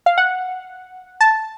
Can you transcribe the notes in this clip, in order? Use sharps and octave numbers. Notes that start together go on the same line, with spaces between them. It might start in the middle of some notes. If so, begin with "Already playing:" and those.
F5
F#5
A5